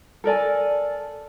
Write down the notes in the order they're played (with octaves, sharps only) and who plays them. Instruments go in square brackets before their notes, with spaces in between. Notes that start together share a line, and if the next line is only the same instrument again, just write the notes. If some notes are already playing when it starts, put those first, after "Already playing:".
[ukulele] A4 A#4 D5 G#5